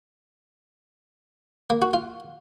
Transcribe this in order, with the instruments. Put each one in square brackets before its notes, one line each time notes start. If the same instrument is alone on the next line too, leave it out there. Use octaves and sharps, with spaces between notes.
[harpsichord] A#3
F#4
F4